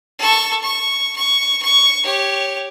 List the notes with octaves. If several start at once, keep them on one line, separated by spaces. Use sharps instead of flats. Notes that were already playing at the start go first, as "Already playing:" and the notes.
A4 C#6
C#6
C#6
C#6
G4 C#5